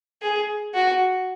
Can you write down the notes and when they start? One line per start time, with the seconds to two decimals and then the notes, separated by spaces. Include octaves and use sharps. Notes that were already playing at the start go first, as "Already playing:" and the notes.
0.22 G#4
0.74 F#4